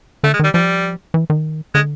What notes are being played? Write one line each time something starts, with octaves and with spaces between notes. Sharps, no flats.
D3 A3
G#3
D#3 G3
F3 G3
E3
D#3
D3 G#3